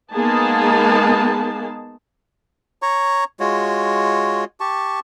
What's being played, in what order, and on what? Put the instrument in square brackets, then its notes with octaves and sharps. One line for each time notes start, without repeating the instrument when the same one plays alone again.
[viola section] G#3 A#3 B3 D#4 G#4 A5
[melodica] C#5 A#5 C#6
G#3 F4 F#4 C#5
G4 A5 C#6